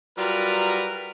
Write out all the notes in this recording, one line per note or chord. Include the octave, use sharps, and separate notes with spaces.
F#3 G3 F4 A#4 B4